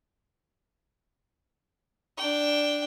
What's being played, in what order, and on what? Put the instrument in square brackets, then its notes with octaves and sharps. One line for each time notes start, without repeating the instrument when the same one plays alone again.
[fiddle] D4 G5